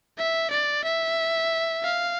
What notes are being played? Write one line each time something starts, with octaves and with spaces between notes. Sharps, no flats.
E5
D5
E5
F5